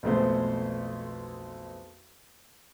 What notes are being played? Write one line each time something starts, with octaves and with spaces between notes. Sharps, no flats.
B1 F2 G#3 A3 B3 C5